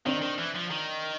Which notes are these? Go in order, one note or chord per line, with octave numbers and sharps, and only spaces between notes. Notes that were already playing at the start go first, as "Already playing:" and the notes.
D#3 C4 D4
D#3
E3
F3
D#3